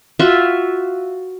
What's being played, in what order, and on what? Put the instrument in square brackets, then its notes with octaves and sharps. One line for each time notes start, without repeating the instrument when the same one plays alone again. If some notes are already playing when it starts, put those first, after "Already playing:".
[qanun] F4 F#4 E5